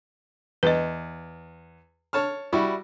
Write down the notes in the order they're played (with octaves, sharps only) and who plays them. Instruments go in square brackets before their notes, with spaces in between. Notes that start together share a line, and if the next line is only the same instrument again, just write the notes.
[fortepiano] E2 [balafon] B4 D#5
[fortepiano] C#5 A5 F6
G3 E4 F#4